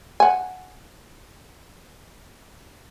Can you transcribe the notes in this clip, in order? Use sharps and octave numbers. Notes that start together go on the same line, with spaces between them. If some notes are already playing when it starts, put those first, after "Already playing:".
F#5 G#5